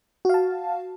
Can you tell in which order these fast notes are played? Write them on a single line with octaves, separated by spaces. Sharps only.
F#4 F5 A5